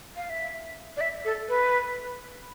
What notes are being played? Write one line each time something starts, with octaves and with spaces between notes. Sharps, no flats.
F5
E5
D5
E5
A4
B4